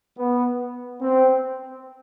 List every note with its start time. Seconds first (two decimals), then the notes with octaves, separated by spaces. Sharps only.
0.18 B3
1.02 C4